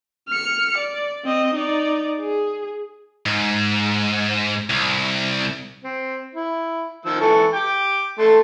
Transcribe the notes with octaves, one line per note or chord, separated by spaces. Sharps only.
F6 C#7
D5
C4 D#5
D#4 D5
G#4
G#2
C2
C4
E4
D#3 F3 E6
E3 A4 C#6
G5 D6
A3 A4 C6